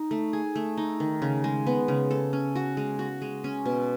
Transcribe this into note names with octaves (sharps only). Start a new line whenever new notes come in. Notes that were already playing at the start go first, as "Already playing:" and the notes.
Already playing: D#4
A3
G#4
A3
D#4
D#3
C#3
G#3
B3
C#3
A4
C#4
F#4
G#3
F#4
G#3
C#4
B2